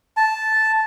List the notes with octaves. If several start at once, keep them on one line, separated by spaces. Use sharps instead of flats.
A5